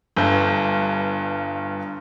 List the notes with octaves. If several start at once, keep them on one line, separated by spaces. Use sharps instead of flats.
G1 G2